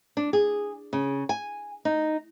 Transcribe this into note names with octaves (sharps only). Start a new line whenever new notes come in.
D4
G#4
C#3
G#5
D#4